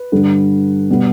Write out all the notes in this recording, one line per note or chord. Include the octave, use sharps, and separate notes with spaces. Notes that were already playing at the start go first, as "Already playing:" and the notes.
Already playing: B4
G2 D3 G3
B2 G3 B3